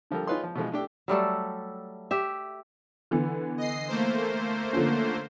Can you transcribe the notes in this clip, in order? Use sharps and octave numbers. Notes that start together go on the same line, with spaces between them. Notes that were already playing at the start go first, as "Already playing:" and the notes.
D3 F3 G3 A4 A#4
D#4 F4 G#4 B4 C#5 C6
F3
B2 E3 F3 G#3
A3 D4 G4 A4
F#3 G3 A3 A4
G4 E5
D3 E3 B3
D#5 C7
A3 A#3 C5
D3 F3 C#4